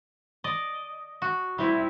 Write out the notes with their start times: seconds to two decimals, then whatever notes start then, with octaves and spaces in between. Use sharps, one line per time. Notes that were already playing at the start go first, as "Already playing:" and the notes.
0.44 D5 D#5
1.22 F#4
1.58 G3 C4 E4